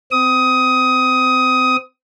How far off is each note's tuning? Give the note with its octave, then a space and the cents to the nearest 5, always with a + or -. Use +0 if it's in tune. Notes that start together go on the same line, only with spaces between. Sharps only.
C4 -25 D#6 +15